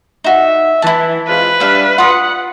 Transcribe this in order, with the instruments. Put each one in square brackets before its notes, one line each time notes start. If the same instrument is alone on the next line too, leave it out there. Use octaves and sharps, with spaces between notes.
[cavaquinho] D#4 F#4 [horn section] E5
[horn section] E3 [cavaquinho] E4 A5
[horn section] G#3 C4 F4 [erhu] B4
[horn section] G3 D4 [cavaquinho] E5 F5
[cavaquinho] F4 D#6 [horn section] F#5